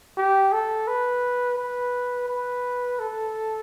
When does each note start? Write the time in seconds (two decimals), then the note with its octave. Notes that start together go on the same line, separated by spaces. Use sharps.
0.17 G4
0.53 A4
0.87 B4
1.58 B4
2.28 B4
3.00 A4